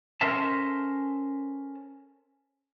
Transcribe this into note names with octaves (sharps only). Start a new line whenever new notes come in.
C#4 A4 A#4 C5 E5 A5